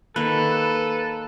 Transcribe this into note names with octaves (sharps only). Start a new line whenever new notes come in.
D#3 A#3 A4 B4